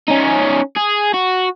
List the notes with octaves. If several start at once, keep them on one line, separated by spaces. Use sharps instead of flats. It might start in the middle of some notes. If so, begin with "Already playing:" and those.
C#4 D#4
G#4
F#4